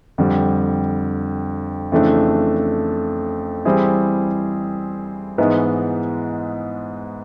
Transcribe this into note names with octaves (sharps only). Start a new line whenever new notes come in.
F2 D3 G3
F2 C#3 E3 A3 D4
E3 G3 C4 E4 G#4
G#2 E3 G#3 B3 E4